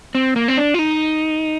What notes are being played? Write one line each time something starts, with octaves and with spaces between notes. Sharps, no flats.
C4
A#3
C4
D4
F4
D#4